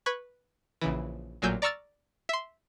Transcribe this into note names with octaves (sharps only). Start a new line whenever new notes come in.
B4 B5 C#6 G#6
A#1 C#3 E3
A1 A#2 F#3 G#5 E6 G6
D5 A#5 C#6 E6 F6 A6
E5 C6